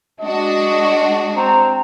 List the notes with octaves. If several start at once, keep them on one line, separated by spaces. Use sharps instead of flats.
G#3 D4 F#4 D#5
C4 A#5